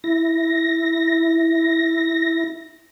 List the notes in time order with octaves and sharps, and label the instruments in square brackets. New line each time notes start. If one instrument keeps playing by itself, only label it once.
[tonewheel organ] E4 A#6